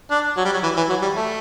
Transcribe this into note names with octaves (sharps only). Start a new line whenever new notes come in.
D4
F#3
G3
F#3
E3
E3
F#3
G3
A3